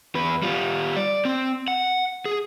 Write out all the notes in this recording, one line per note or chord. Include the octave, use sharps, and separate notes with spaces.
E2 B4
G3 F4
D5
C4
F#5
G#4